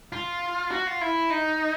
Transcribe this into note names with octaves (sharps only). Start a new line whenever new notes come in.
F4
F#4
F4
E4
D#4